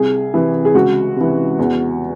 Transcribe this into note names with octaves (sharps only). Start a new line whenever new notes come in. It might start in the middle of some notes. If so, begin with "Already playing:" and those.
Already playing: C2 G#4
C3 E3
G#4
C#2 F#4
C3 E3
E2